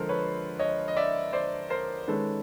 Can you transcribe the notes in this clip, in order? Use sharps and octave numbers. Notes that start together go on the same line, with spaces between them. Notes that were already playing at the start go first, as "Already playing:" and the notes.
Already playing: D3 F3 G#3 A4 A#4 C5
B4 C#5
C#5 D#5
D#5
D5 E5
C5 D5
A#4 C5
D#3 G#3 C#4 A4 B4